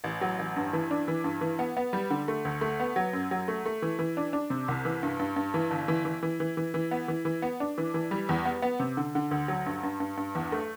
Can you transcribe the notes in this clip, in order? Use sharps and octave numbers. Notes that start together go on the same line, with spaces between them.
A1
F#3
A1
G2
E3
D4
E3
G2
E3
B3
B3
G3
D3
A3
D2
A3
B3
F#3
F#2
F#3
A3
A3
E3
E3
D4
D4
C3
C2
E3
G2
G2
G2
E3
G1
E3
E3
E3
E3
E3
E3
B3
E3
E3
B3
D4
E3
E3
G3
E2
B3
B3
C3
D3
D3
D2
F#3
G2
G2
G2
G2
E2
A3